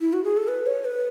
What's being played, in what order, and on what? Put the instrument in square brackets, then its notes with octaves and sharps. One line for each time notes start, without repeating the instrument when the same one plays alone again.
[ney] E4
F#4
G#4
A4
B4
C#5
B4